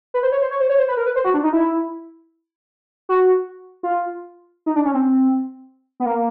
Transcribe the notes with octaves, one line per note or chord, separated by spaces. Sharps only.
B4
C5
C#5
C5
C#5
C5
C#5
C5
B4
A#4
B4
C5
F#4
D4
D#4
E4
F#4
F4
D#4
D4
C#4
C4
B3
A#3